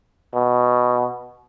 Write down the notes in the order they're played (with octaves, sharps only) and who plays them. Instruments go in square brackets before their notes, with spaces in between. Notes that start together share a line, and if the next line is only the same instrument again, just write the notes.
[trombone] B2